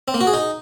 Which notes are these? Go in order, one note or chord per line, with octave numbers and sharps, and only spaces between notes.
C4
A#3
F#4
G#4
D#4